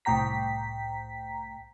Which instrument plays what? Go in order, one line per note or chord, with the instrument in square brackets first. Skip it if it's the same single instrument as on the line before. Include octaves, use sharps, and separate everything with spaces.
[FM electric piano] C2 A2 G5 A#5 B6